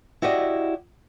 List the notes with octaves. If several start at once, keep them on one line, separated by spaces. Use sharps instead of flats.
E4 F#4 G4 D5 D#5